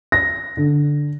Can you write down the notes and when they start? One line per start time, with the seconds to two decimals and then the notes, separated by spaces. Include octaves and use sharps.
0.12 A#6
0.57 D3